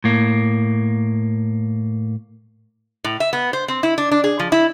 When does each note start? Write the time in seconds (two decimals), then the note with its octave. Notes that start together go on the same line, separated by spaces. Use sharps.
0.04 A2 A#3
3.04 A2
3.20 E5
3.33 B3
3.53 C5
3.68 C4
3.83 E4
3.98 D4
4.11 D4
4.24 G#4
4.39 F3
4.52 E4